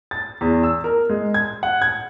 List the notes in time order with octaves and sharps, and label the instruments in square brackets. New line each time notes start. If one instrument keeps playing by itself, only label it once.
[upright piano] A6
E2
E6
A#4
G#3
G#6
F#5
G#6